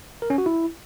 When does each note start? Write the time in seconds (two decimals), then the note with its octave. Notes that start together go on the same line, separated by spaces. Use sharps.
0.22 A#4
0.30 C#4
0.38 F#4
0.46 E4